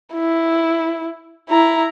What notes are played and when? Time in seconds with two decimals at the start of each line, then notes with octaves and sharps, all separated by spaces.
0.14 E4
1.50 E4 A#5